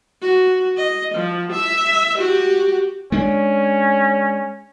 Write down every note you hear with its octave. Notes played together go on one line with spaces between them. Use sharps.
F#4
D#5
F3
E5
F#4 G4
G#3 C#4 D4